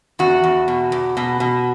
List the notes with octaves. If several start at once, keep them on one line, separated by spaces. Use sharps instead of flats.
E2 F#4
E2
B2
E2
B2
B2